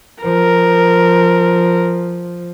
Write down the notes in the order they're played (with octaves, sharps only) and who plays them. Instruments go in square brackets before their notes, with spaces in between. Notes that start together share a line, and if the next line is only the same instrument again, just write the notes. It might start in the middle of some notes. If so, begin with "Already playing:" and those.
[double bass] F3 [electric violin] A#4